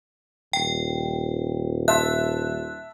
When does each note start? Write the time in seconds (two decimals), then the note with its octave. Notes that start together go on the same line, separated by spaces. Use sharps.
0.53 D#1 G5
1.88 E5 A5 C6 F#6